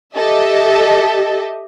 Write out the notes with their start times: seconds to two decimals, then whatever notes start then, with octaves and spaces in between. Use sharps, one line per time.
0.14 G4 A4 D#5 E5